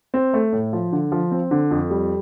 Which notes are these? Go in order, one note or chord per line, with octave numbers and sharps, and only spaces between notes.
C4
A3
A2
F3
D3
F3
C4
D3
F2
G3